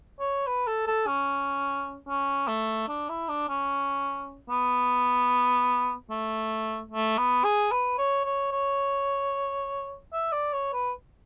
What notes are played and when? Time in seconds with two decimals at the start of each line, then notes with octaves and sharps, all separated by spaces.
0.20 C#5
0.47 B4
0.67 A4
0.87 A4
1.07 C#4
2.08 C#4
2.48 A3
2.88 D4
3.09 E4
3.29 D4
3.49 C#4
4.49 B3
6.10 A3
6.91 A3
7.18 B3
7.44 G#4
7.71 B4
7.98 C#5
8.25 C#5
8.52 C#5
10.13 E5
10.32 D5
10.53 C#5
10.73 B4